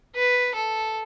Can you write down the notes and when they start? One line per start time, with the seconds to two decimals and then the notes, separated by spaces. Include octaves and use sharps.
0.16 B4
0.55 A4